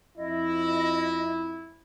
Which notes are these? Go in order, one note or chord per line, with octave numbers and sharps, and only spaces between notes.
F2 E4 D#5